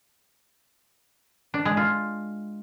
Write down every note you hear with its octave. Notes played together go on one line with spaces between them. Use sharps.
D4
G#3
F4